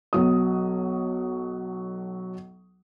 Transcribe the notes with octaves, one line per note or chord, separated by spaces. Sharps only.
B1 F#3 D#6